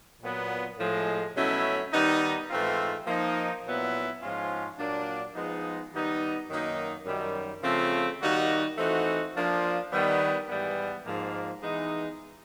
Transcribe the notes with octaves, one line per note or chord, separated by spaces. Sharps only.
A#2 F#3 B3
A2 F3 G#3
B2 F#3 A3 C#4 E4
D#3 G3 B3 D#4
G#2 E3 A3 C4 F4
F3 A#3 D#4
A#2 F#3 B3 E4
G#2 F3 G#3 C#4 F4
A#2 F#3 A#3 D4
F3 G#3 B3 D#4
D#3 G3 B3 D#4
F#2 D#3 F#3 A#3 D#4
F#2 D#3 G3
C#3 F3 A3 C4 F4
D#3 G3 A#3 D#4 F#4
E3 A3 C4 D#4 F#4
F3 A#3 D4 F4
D#3 G3 B3
G#2 E3 G3 B3
G#2 F3 A#3
E3 G#3 B3 D#4